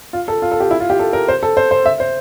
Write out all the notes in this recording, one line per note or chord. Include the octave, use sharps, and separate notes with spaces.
F4
A4
F4
A4
G4
E4
F4
G4
A4
A#4
C5
A4
C5
C5
E5
C5